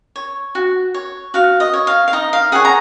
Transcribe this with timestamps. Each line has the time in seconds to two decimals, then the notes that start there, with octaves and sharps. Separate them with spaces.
0.16 C#5
0.55 F#4
0.94 C#5
1.34 F#4 F5
1.60 D#5
1.73 C#5
1.87 F5
2.08 F5
2.13 D#4 D#5
2.33 F5
2.52 G#4 C#5 F#5
2.65 A#5